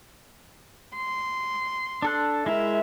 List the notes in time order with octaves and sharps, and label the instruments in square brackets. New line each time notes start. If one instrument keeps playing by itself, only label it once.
[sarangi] C6
[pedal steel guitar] D4 A4 F#6
[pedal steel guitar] G#3 E4 A#4 [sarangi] E5